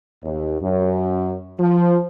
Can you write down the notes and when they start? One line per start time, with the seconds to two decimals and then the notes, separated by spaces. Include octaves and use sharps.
0.23 D#2
0.61 F#2
1.59 F3